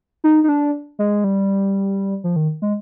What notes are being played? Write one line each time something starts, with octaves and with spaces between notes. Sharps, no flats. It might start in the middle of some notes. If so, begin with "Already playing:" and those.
D#4
D#4
D4
G#3
G3
F3
D#3
G#3